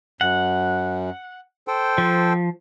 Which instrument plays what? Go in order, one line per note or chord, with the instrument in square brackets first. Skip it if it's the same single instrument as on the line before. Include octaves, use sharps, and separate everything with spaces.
[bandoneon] F#2 [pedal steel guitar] F#5
[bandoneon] A4 C5 G5
[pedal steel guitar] F3